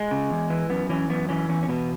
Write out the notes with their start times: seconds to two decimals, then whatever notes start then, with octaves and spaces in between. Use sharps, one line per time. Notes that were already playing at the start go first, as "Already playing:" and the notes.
Already playing: G#3
0.11 C#3
0.30 E2
0.50 E3
0.70 F#2 B3
0.89 E3 C#4
1.09 F#2 B3
1.29 E3 C#4
1.49 E2 C#4
1.63 C#4
1.68 B2 B3